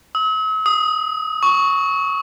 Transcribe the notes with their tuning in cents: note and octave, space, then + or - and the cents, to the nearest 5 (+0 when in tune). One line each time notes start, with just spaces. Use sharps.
E6 -45
D#6 +5
C#6 +5